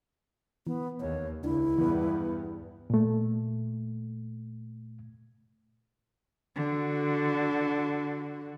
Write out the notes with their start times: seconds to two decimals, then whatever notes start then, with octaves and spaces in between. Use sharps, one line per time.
0.67 E3 B3
1.00 D#2 C#5
1.44 C#2 D4 E4
1.78 E2 G2 E3 B3
2.90 A#2 A3
6.56 D3 F#4